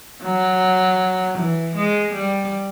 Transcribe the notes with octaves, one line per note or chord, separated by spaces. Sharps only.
F#3
E3
G#3
G3